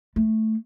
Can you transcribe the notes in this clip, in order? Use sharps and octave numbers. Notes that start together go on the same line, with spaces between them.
A3